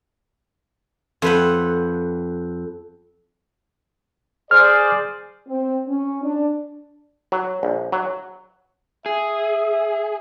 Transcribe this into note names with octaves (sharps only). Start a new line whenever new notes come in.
F2 B4 F#5
G#4 C5 D5 F6
C4
C#4
D4
F#3
A#1
F#3
G#4 E5